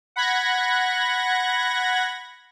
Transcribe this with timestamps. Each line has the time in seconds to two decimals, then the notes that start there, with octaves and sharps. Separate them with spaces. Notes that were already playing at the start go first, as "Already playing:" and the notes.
0.16 F#5 B5 F#6 G#6 A#6